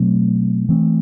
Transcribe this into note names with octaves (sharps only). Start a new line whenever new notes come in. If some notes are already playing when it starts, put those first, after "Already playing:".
Already playing: B2 F#3 A3 C4
E3 A3 C4